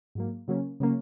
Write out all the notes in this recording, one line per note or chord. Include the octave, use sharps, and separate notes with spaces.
G#2 F#3 A#3
C#3 F#3 A#3 C#4
C#3 F#3 A#3 C#4